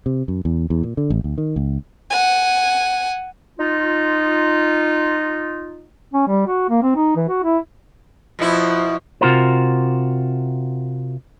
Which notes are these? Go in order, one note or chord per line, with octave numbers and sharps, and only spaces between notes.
C3
F#2
E2
E2
A#2
D3
A1
D2
D#3
C#2
F#5 G#5
D#4 F4
C#4
G3
F#4
A#3
C4
D#4
E3
F#4
E4
B2 F3 E4
C3 F4 F#4 A#4 C5